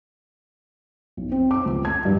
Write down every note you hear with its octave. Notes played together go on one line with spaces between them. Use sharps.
B1
C4
D6
C#2
G#6
G2